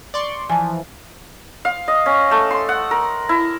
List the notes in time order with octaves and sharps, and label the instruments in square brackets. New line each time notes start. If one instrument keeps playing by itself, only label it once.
[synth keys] D5 C6 C#6
[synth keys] E3 F3 [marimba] G#5 A5
[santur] F5
D#5
C#4
A3
C6
F#5
A#4
E4